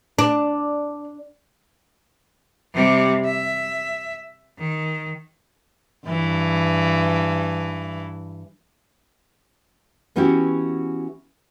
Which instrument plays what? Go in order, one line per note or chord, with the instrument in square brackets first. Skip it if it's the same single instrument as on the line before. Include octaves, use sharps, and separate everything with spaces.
[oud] D4
[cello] C3 G3
E5
D#3
[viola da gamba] G2 E3
[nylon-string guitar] E3 B3 C#4 E4 F#4 G4